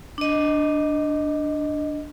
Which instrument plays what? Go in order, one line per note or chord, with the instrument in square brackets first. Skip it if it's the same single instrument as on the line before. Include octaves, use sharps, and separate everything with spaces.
[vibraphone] D4 D#5